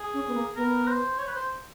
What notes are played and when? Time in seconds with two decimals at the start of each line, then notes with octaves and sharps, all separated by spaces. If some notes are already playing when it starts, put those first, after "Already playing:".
Already playing: G#4
0.14 C#4
0.28 B3
0.34 A#3
0.56 B3 A#4
0.88 C5
1.19 C#5
1.27 B4
1.35 C5